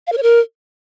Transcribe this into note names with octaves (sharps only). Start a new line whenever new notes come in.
F5
A#4
C#5
A#4